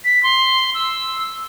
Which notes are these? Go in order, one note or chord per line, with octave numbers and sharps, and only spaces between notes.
B6
C6
E6